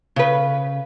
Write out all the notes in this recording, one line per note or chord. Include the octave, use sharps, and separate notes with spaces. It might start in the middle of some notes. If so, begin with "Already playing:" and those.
C#3 B4